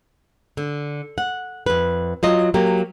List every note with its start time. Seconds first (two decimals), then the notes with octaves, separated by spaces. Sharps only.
0.57 D3
1.18 F#5
1.66 F2 B4
2.23 F#3 F4 D#5
2.54 F#3 A#3 G4